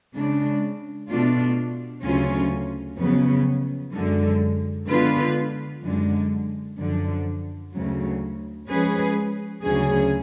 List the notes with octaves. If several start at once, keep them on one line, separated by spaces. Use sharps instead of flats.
C#3 G#3 D4
B2 A3 D4 F4
D2 C#3 F#3 C#4 F4
F2 C#3 F#3 B3
F#2 D3 G#3
D3 G#3 B3 F4 B4
F#2 D3 G#3
F#2 D3 F3
D2 C#3 F#3
F3 G#3 C#4 G#4 B4
D2 C#3 F#3 C#4 G#4